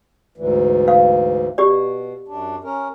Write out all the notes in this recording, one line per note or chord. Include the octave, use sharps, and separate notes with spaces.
D2 G#2 E3
F5
B2 G4 D5
F#2 D4
C#4 A#4